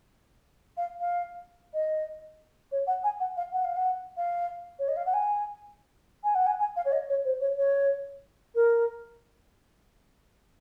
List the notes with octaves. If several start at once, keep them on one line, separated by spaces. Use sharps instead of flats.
F5
F5
D#5
C#5
F#5
G#5
F#5
F5
F#5
F5
F#5
F5
C#5
D#5
F5
F#5
G#5
G#5
F#5
G#5
G#5
F5
C#5
D#5
C#5
C5
C#5
C#5
A#4